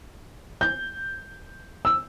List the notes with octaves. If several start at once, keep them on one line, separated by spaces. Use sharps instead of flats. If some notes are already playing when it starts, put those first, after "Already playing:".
G6
E6